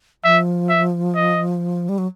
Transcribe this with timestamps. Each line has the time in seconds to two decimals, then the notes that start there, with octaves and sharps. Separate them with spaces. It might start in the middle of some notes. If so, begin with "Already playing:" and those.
0.24 F3 E5
0.69 E5
1.15 D#5
1.89 G3
1.98 F#3